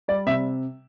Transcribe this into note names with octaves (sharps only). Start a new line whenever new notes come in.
G3 D5
C3 E5